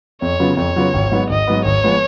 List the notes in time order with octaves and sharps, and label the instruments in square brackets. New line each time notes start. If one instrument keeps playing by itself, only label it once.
[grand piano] F2 [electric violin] C#5
[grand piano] C#3 F#3 B3 F4
[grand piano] F2 [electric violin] C#5
[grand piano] C#3 F#3 B3 F4
G#1
G#2 F#3 B3
[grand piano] G#1 [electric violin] D#5
[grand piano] G#2 F#3 B3
[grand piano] G#1 [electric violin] C#5
[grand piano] F3 G#3 B3